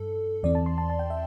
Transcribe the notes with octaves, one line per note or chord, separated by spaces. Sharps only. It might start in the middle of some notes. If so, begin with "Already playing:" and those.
Already playing: G2 A4
E2 E3 C4 D5
A5
C6
A5
A5
G5
E5